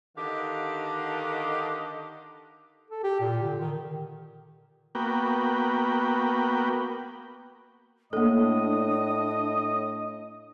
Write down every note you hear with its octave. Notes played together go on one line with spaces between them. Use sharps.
D3 D#3 G4 D#5 F5 F#5
A4
G4
A#2
D3
D#3
A#3 B3 F#4 G5
A2 A#3 D4 A4 D#5